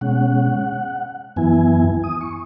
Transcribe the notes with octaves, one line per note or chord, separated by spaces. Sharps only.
B2 G#3 C#4 F#5
F#2 E3 B3 E4 G#5
D#6
C#6